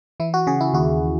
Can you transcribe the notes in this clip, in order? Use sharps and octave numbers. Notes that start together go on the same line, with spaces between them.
E3 E4
F#4
C#3 G#4
E4
D#2 F#4